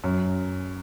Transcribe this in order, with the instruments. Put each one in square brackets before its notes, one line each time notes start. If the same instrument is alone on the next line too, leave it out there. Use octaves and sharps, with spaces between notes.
[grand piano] F#2